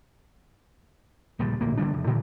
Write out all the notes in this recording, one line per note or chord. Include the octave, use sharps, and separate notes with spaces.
A#1 D#2 D3 G3
D1 A#1 A#3
D3 G3 D4
F1
A2 D3 E3 G#3